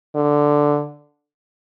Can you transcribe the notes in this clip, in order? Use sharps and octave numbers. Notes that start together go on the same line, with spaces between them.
D3